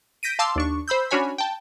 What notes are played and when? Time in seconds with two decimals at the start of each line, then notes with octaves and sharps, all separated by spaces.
0.23 G6 A#6 B6 D7 D#7
0.39 F5 A5 C6 D6 E6
0.56 D#2 D4 C#6
0.88 C5 B5 E6 G6
1.11 C#4 D4 F#4 C#5 G#5 B5
1.38 G5 A5